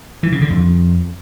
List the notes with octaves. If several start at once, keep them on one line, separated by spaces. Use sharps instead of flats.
E3
C#3
D3
F2